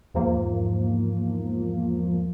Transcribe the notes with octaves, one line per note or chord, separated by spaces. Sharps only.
E2 G#2 F3 A#3